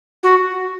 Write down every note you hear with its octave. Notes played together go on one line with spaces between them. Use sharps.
F#4